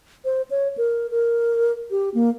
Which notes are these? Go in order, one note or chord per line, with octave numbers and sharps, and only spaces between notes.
C5
C#5
A#4
A#4
G4
A#3